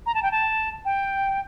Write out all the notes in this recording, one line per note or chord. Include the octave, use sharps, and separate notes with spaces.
A#5
A5
G5
A5
G5